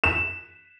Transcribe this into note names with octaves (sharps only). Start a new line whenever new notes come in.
E7